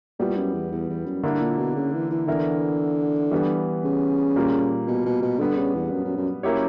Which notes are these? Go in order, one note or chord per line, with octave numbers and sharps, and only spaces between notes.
A#2 G3 B3 E4 G4
F#2
E2
E2
E2
F#2
G2 D3 A#3 E4
A#2
B2
C#3
E3
E3
D3 E3 B3 E4 A#4 E5
E3 G3 B3
C#3
A#2 G3 A#3
B2
B2
B2
D3 G3 B3 D4
C#3
E2
F#2
F#2
F#2
F#2 A#3 E4 G4 C#5